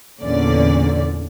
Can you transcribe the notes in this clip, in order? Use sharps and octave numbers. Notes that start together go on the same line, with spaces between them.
E2 A#2 D3 C#4 D5